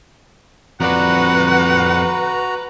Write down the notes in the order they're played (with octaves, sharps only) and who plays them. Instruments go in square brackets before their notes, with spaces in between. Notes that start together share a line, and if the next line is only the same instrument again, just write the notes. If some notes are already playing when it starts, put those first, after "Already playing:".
[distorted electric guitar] F2 D5 [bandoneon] F#4 A#5 [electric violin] B4 [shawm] F#5